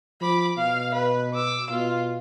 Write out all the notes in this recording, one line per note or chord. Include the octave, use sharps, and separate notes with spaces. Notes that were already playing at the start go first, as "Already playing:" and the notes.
F3 B5 D6
B2 F5
B4
D6 E6
B2 F4